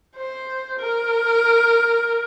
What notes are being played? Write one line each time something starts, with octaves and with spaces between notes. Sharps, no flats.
C5
A#4